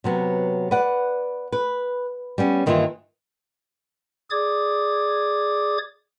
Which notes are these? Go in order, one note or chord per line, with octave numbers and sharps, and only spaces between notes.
C3 F#3 B3
B4 D5 F#5
B4
G3 B3 C#4
G2 D#3 E3 A#3 F4 E5
G#4 D5 D6 D#6 G#6